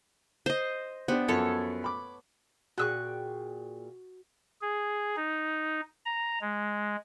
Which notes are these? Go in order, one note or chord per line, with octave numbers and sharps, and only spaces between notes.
C5 D#5
B3 D4 G4 C5
F#2 F3 B3 A4 C#5
B5 D6
A#2 F#4 G#4 G5 C#6 E6 F#6
G#4
D#4
A#5
G#3